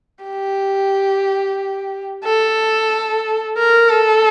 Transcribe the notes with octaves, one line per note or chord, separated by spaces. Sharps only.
G4
A4
A#4
A4